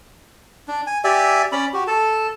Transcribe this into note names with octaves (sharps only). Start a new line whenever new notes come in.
D4
G#5
G4 D5 E5 G#5
C#4 D5 B5
F#4 G4
A4 A5